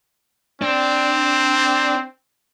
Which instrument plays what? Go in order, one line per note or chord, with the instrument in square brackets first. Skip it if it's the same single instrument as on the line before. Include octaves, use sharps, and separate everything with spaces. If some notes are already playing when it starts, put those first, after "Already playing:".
[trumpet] C4 [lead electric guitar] D4